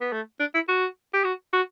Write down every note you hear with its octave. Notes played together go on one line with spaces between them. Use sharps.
B3
A3
D4
E4
F#4
G4
F#4
F#4